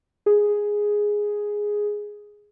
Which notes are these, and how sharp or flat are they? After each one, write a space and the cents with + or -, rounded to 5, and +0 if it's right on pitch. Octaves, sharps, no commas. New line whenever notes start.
G#4 -5